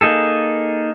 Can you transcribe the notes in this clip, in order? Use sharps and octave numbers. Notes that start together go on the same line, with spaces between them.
A#3 D#4 G#4 A4